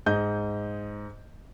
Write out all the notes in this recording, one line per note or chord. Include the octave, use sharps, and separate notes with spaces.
G#2 D#5 G6